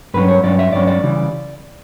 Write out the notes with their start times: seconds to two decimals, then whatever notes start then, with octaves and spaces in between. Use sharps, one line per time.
0.14 G2 F#3 C#4 B4
0.28 C#5
0.43 G2 F#3 C#4 D5
0.59 E5
0.73 G2 F#3 C#4 D5
0.87 D5
1.03 C#3 E3 G3